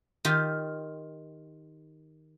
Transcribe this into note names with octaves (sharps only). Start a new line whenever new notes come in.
D#3 F4 G4